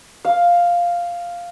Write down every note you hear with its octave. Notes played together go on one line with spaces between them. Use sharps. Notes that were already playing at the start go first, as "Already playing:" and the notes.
F5